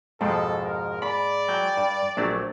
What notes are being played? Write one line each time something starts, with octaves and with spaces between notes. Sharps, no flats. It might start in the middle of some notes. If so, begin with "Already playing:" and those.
F2 G#2 B2 F3 A4
A#4
D5 B5
F#3 G5
G2
A#1 F#3 A3 D4